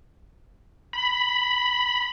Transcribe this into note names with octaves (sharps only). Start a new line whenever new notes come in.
B5